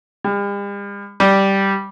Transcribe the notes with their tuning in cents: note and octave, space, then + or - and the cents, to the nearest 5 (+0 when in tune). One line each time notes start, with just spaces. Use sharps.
G3 +45
G3 -5